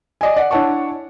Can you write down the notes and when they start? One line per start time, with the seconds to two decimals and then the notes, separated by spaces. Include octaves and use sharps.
0.21 D5 D#5 G#5
0.36 D5 F#5
0.51 D4 E4 C#5 F#5 A5 C#6